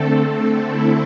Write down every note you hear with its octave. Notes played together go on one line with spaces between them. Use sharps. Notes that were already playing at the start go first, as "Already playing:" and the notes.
Already playing: D3 A3 C4 A4
E4